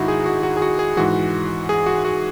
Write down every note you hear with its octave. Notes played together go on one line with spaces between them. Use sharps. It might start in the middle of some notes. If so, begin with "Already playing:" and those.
Already playing: G#2 D#3 D#4 E4 F#4
G#4
F#4
F#4
G#4
F#4
G#4
G#2 E3 F#4
G#4
F#4
F#4